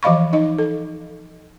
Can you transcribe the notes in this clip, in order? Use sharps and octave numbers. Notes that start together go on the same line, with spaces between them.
E3 F3 D#5 F5 B5 C#6
D#4 D#5
A4